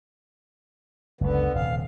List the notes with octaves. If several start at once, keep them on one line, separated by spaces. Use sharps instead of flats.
F#1 C#2 D3 B3
D#1 C3 F5